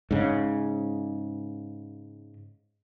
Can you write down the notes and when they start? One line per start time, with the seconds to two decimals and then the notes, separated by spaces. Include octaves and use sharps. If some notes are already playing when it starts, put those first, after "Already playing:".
0.11 G#2 C#3